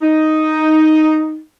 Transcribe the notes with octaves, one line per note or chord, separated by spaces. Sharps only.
D#4